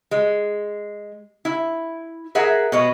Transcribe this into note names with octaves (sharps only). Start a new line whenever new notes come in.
G#3
E4
G#4 A#4 E5 F#5
B2 B4 C#5 D#5